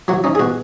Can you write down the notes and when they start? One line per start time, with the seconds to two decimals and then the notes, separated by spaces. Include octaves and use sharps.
0.08 F#3 F#4 F#5
0.24 C#4 D#4
0.35 G#4
0.39 B2 F#4